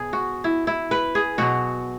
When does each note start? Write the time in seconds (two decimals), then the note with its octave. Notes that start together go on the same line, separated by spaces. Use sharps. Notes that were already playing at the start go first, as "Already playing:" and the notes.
Already playing: B2 G#4
0.13 F#4
0.44 E4
0.67 E4
0.91 B4
1.15 G#4
1.38 B2 F#3 F#4